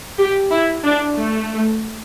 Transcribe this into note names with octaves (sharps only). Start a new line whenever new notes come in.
G4
E4
D4
A3